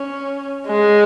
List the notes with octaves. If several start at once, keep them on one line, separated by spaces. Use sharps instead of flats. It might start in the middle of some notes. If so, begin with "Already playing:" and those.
Already playing: C#4
G#3